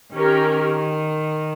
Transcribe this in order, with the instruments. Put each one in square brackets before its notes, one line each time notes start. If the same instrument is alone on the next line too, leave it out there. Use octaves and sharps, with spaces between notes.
[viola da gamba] D#3 [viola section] C#4 G4 A#4